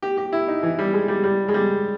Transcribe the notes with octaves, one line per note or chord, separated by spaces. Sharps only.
G4
G4
E4
D#4
E3
G3
G#3
G3
G3
G#3
G3